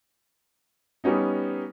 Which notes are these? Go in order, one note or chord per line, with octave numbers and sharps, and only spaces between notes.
G3 B3 C#4 D#4